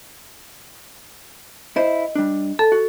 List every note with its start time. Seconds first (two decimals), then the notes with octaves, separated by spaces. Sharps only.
1.76 E4 C5 D#5
2.15 G3 D4
2.59 A4 A5
2.72 F#4